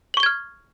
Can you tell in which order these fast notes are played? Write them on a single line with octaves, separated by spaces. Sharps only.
F#7 C#6 G7 G#6 F6